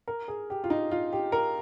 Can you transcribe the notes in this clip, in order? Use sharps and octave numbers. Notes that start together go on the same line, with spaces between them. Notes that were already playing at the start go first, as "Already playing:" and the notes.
A#4
G#4
G4
F4
D#4
F4
G4
A#4